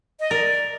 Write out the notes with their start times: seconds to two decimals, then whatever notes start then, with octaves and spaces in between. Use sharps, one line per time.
0.20 D#5
0.30 A#4 D5